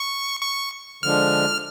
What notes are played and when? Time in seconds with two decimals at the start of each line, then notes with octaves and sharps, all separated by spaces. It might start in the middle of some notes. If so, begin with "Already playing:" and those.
Already playing: C#6
0.42 C#6
1.03 D3 F3 G#3 D4 F6